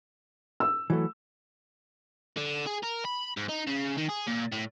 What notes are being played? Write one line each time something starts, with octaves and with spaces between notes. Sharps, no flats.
E6
E3 F#3 A3
D3
G#4
A#4
B5
G#2
D#4
C#3
D#3
G#4
A#2
A2